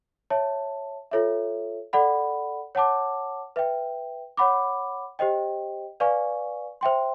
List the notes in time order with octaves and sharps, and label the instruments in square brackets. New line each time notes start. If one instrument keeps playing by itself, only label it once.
[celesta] C#5 E5 A5
F4 A4 C#5 E5
A4 D5 F#5 B5
C#5 F#5 A5 D6
B4 E5 G5
C#5 F#5 B5 D6
G4 C5 D#5 G5
B4 D5 F5 G#5 C#6
C5 E5 G5 C6